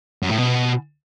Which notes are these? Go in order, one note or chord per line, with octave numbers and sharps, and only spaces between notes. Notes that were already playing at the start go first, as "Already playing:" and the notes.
F#2
A2
B2